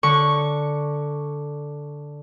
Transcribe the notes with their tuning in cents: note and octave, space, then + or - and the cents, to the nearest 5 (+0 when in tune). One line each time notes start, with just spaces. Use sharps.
D3 +0 C#6 +0